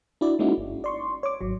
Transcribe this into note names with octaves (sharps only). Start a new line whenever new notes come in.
D4 E4 F#4 D5
G#3 A#3 C#4 D#4 E4 F#4
G1
D5 C6 C#6
C#5 D6
G#1 F#3